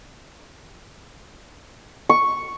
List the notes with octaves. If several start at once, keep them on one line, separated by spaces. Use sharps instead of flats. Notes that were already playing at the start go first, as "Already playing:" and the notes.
C#6